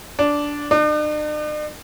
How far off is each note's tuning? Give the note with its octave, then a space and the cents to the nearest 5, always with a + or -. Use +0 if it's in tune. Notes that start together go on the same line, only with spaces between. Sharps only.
D4 -10
D4 +45